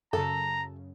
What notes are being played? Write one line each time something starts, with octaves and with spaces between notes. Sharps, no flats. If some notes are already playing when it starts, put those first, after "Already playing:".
F#2 C#3 A4 A#5